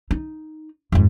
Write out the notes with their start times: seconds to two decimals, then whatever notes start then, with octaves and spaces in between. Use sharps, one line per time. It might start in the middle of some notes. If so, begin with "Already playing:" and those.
0.11 D#4
0.92 F2 G#2